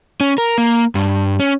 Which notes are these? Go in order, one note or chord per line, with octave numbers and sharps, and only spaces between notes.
C#4
A#4
A#3
G2
C#4